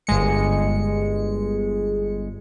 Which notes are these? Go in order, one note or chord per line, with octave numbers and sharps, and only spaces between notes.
G1 G#3 C#7